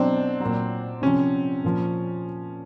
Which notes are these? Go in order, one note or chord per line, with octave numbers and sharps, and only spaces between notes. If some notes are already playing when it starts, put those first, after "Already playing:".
Already playing: B2 F#3 C4 D4
A#2 F#3
C3 F3 C#4
A#2 F3